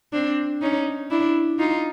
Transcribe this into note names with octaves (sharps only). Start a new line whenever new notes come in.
C4 D4
C#4 D#4
D4 E4
D#4 F4